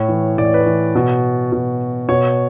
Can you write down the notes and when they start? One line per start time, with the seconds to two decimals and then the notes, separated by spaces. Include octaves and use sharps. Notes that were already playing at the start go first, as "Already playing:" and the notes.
Already playing: A2 C#5
0.08 E3
0.38 A2 D5
0.45 C#5
0.54 B4
0.61 C#5
0.66 E3
0.95 B2
1.53 B2
2.09 B2 C#5